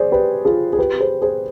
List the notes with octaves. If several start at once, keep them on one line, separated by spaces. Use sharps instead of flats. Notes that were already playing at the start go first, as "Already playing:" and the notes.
Already playing: G#4 C5 D5
G4 B4
F4 G#4
G#4
G4 B4
G#4 C5
G#4 C5